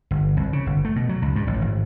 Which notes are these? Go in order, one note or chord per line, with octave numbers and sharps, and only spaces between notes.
G1
C2
C#3
G1
A3
B2
F#3
C#2
G2
A1
G#1